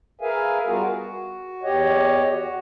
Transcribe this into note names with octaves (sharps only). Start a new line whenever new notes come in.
G#4 A#4 B4 E5 F5 G#5
G3 B3 F4 F#4 G#4 A#4
F#4
E2 G4 C#5 D#5
F#4